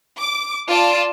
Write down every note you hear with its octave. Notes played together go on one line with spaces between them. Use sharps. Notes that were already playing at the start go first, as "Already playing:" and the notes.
D6
F4 D5 A5 D7